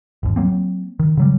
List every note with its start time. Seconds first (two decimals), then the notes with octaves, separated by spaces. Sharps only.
0.23 G#1 D#2
0.36 F#3 A#3 C4
1.00 D#3
1.17 C#3 F#3 G3